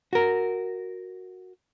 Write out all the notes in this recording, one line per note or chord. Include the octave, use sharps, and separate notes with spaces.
F#4 A#4